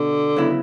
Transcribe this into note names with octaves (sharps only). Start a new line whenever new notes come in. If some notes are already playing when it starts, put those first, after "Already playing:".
Already playing: B2 D3 G4
C#3 F#3 B3 E4